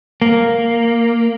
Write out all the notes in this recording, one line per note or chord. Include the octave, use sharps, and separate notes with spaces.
A#3